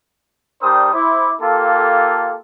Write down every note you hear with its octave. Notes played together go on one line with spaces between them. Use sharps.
G3 D4 A#4 C5 G5 D#6
E4 C5 D6
A#3 F4 G4 A4